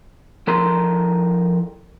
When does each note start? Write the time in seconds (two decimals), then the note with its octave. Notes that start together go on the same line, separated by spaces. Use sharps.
0.47 F3 E4 A4 A#4 A#5 C6